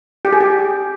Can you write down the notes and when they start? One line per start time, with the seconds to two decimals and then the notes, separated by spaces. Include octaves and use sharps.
0.25 G4
0.33 G#4
0.40 G4